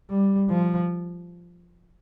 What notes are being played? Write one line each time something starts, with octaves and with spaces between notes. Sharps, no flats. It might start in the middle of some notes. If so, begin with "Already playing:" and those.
G3
F3